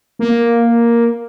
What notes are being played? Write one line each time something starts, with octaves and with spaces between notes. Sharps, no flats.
A#3